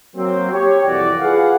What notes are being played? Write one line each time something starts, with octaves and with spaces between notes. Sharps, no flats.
F#3 A#3 C4
G4 C#5
C2 F2 E3 F#4 D5
F4 G#4 B4 F5 F#5